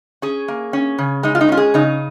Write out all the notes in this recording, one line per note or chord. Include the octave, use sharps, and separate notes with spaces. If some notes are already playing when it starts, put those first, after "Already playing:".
C#4 G#4
A#3
C#4
C#3
G#3 D#4
F4
D#4
C#4 F4
G#4
C#3 D#4